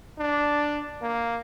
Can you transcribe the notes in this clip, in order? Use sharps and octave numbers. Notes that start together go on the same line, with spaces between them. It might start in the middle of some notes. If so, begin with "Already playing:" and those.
D4
A#3